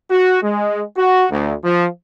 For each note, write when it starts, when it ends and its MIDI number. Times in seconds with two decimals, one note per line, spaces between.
0.11 0.42 66
0.42 0.83 56
0.97 1.26 66
1.31 1.53 38
1.64 1.88 53